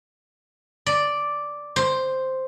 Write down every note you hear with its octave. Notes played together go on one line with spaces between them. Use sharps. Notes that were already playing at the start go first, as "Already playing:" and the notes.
D5
C5